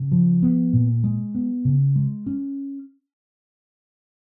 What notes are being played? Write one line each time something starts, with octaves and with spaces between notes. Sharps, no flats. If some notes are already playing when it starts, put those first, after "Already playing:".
Already playing: C#3
F3
B3
A#2
G#3
B3
C#3
G#3
C#4